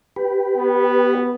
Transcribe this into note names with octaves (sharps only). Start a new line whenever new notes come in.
G4 B4
B3